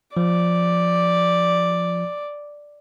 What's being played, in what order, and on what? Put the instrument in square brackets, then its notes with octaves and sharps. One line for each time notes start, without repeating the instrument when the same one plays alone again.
[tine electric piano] F3 [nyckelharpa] D5